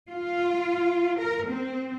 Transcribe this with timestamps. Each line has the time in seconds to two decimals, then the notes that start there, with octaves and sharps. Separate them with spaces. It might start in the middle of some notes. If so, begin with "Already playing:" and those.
0.10 F4
1.19 A#4
1.49 C4